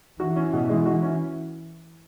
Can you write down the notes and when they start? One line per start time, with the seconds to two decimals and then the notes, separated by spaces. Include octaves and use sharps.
0.19 E3 F#4
0.36 C#4
0.53 B2
0.69 G#3
0.86 F#4
1.02 C#4